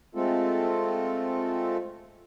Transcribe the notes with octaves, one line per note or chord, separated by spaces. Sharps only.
G#3 A3 C4 F4 A4